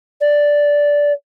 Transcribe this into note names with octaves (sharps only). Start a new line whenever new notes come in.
D5